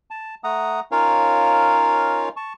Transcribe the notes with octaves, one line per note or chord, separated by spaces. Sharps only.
A5
A3 F#5 A#5 D#6
C#4 D#4 F4 A#4 C#5 F5
A5 C#6